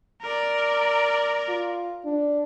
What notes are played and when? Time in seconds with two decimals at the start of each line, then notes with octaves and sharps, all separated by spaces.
0.23 A#4 D5
1.49 F4
2.05 D4